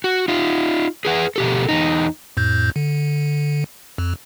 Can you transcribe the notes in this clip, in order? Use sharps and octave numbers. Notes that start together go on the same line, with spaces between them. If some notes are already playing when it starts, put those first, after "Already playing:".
F#4
D#4 F4
G#4 B4 F#5
B2 G4 A4
E2 A#2 D#4
F2 A2 G6
D3
F2